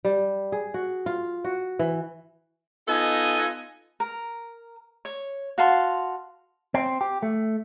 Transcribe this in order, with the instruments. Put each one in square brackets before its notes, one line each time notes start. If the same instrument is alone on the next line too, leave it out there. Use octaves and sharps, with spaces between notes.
[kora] G3
G#4
F#4
F4
F#4
E3
[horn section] B3 D#4 F4 A4 D#5 G#5
[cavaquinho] A#4
C#5
F#4 F5 A5 C6
[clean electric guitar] C4
G4
A3